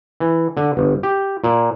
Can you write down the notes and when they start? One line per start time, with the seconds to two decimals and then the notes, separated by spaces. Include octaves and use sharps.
0.20 E3
0.57 D3
0.77 G1
1.03 G4
1.44 A#2